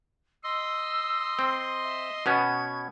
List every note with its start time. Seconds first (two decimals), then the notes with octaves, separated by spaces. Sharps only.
0.44 D#5 C6 E6
1.39 C4
1.83 E5
2.26 B2 B3 C#4 G#6